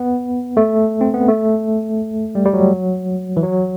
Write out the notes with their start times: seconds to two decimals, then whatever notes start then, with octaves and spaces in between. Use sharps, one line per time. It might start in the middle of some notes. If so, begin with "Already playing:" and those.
Already playing: B3
0.57 A3
1.01 C4
1.14 B3
1.28 A3
2.35 G3
2.45 G3
2.53 F#3
3.37 E3
3.43 F#3